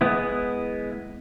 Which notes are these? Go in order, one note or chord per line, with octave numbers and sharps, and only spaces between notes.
G#3 B3 E4